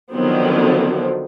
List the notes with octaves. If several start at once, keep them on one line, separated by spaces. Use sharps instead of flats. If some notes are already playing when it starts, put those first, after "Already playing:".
D3 D#3 F3 F#3 B3 C4